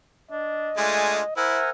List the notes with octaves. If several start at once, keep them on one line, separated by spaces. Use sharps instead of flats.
D4 D#5
G#3 A3 D4 F4 G#5
E4 A#4 C5 E5 F#5 G#5